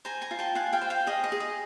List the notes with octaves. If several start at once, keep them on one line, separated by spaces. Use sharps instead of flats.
C5 G#5 A#5
G#5 A#5
F4
G5 A5
F4 F#5 G#5
F5 G5
C5
F5 G5
G#4 D#5
D#5
G#4
D#5